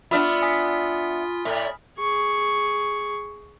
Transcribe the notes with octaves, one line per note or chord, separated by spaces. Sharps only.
B3 D4 F4 E5 B5 D#6 F6
G#5 D#6 B6
A2 D5 E5
G#4 C#6